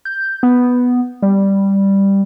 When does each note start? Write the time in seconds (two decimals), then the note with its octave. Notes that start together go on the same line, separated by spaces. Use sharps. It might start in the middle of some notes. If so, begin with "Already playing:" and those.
0.05 G6
0.43 B3
1.23 G3